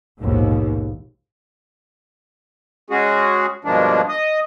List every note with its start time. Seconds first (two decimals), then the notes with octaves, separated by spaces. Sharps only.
0.21 A#1 D#2 G#2 B2
2.90 G#3 C#4 F#4 G#4
3.65 G2 B2 F3 G#3 A#3 D4
4.08 D#5 D#6